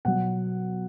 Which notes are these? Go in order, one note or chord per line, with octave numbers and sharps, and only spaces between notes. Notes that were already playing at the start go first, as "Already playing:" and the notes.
B2 F#3 F#5